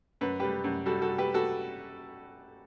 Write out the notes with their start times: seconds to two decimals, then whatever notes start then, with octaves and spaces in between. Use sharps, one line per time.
0.21 F#2 B4
0.40 G3 G4 B4
0.64 F#2
0.86 G3 F#4 A4
1.02 F#4 A4
1.08 G3
1.18 G4 B4
1.34 F#4 A4